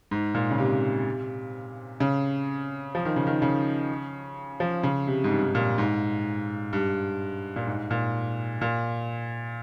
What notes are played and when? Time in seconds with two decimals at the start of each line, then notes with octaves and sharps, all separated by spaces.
0.11 G#2
0.34 A#2
0.51 C#3
0.58 C3
2.00 C#3
2.95 F3
3.05 D#3
3.16 C#3
3.27 D#3
3.42 C#3
4.60 F3
4.83 C#3
5.07 C3
5.24 G#2
5.31 G2
5.43 G#2
5.55 A#2
5.78 G#2
6.73 G2
7.56 A#2
7.67 G#2
7.90 A#2
8.61 A#2